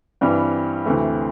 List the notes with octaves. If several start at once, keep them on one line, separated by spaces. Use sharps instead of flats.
G2 E3 G3 C4
D2 C3 E3 A3 C4